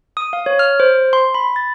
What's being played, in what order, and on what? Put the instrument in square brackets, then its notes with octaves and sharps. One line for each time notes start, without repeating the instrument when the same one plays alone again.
[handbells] D#6
F5
C#5
F6
C5
C6
B5
A6